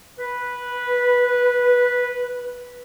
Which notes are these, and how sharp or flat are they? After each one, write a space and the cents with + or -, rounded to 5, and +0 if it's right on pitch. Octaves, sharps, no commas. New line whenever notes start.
B4 -10